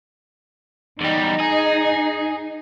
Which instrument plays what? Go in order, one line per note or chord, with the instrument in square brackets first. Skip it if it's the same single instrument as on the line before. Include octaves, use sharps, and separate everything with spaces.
[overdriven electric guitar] E2 G3 [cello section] D#4
[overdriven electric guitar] G#4